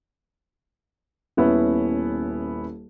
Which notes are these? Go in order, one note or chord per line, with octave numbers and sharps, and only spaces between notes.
D#1 B3 C#4 E4